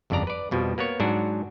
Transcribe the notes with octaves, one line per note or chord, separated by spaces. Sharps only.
G1 F2 C#3 D4 D5 A#5
B4 D5
F2 B2 F3 G3
A#3 B3 A#4 C#5
G#2 F#3 D4 F#4